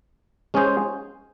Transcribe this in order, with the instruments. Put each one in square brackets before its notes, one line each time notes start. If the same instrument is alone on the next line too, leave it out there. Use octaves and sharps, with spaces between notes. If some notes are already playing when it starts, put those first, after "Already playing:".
[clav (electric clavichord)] G#3 C#4 G#4 C5